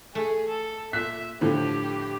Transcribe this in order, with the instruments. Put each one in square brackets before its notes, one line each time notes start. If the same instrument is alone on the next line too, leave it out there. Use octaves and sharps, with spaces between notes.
[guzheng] A3 [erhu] G#4
[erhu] A4
[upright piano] A#2 F#6 B6 [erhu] E5
[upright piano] A2 D3 F3 [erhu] G4